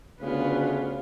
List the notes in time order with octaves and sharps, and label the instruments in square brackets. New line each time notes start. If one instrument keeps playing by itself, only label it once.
[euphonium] D2 [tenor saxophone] C#3 [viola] B3 F4